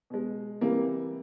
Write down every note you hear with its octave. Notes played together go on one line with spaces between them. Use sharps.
B2 G#3
C3 E3 G3 A#3